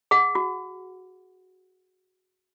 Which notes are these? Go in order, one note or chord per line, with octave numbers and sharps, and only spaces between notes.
G#4 F#5
F#4